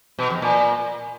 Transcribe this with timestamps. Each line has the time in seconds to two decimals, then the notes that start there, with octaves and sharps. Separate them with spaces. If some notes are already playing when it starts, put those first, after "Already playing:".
0.19 B2
0.30 F2
0.42 A#2